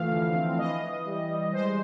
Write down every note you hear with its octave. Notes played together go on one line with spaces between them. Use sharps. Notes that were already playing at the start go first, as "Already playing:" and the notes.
Already playing: E3 F3 A3 F5
D3
C4
E3 D#5
E3
G3
G3
G#3 C5